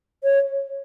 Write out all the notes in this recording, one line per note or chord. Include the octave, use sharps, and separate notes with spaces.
C#5